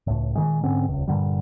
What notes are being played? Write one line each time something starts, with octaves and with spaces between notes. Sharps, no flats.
C#2 A2
A#2 D#3 G#3
G#2 D3 C4 C#4
D#1 C#2
G2 A#2 D3 G3